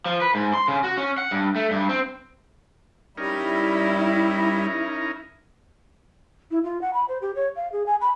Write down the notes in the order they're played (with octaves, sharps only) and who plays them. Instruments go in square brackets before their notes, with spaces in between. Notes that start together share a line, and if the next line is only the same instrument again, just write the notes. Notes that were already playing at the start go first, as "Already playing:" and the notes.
[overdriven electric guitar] F3
B4
G#2
C6
C#3
F#4
C#4
F#5
G2
A3
G2
C4
[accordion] G3 [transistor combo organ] C#4 D#4 A#4 [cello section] E4
[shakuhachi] E4
F4
F#5
B5
C5
G4
C#5
F5
G#4
G#5
B5